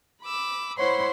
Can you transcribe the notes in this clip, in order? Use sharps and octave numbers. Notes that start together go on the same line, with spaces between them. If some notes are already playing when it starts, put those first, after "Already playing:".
B5 D6 E6
E4 C5 C#5 F#5 B5 C6